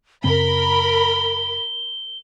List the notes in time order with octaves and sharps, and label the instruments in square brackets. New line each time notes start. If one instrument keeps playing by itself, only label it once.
[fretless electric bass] F#2 C#3 C4 [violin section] A#4 B5 [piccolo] G7